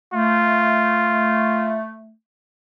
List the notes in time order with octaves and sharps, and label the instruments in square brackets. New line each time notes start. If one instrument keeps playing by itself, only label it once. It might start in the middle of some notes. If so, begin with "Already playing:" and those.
[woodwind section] A3 [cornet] F4